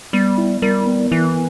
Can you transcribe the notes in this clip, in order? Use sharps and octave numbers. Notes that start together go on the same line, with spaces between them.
G3 B3
E4
G3 A#4
B3
E3 E4